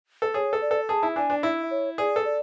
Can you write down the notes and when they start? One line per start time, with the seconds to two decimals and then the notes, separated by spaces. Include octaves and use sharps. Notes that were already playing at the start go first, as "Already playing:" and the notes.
0.22 A4
0.34 G#4 C#5
0.53 A4
0.62 D5
0.71 A4
0.88 G#4 A5
1.03 E4
1.16 D4 G#5
1.30 D4
1.43 E4 E5
1.71 C#5
1.98 G#4 D5
2.16 A4
2.25 D5